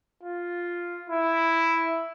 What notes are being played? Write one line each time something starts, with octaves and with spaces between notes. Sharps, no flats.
F4
E4